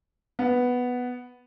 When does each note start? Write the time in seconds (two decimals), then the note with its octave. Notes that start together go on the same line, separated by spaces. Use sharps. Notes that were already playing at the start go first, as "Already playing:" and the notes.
0.39 B3